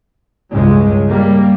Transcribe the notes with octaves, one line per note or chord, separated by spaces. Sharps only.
C#2 G2 C#3 G#3
G3 A#3